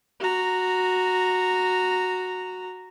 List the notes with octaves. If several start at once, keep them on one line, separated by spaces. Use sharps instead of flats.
F#4 A#5